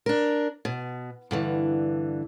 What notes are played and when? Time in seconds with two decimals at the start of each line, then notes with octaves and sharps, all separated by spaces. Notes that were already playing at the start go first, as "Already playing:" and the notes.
0.06 D4 A#4
0.65 B2
1.31 G2 D3 E3